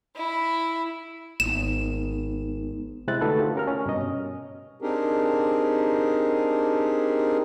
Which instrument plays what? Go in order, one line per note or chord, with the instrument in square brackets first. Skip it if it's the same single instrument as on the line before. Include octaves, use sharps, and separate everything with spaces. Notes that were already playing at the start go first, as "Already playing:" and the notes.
[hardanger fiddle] E4
[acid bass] G#1 [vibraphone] G#3 B3 D#4 [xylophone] E7
[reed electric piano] C3 G#3 C4 E4 F#6 A6
D3 A3 D#4 F#4 A4 B4
F4 G4
C#4 A#4 F6
C#4
G2 B2 D#5
[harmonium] C4 D4 D#4 G4 G#4 A#4